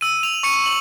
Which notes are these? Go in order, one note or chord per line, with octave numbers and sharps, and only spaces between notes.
E6 D#7
F7
C#6 C#7 D#7
F#7